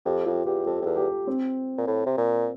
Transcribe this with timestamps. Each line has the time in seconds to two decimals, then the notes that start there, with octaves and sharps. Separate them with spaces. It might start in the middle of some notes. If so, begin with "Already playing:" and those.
0.05 F2 G4
0.26 F2 F4
0.45 E2 G4
0.66 F2 A4
0.81 F2
0.86 E2
0.96 G4
1.27 C4
1.78 A#2
1.87 A2
2.06 C3
2.18 A#2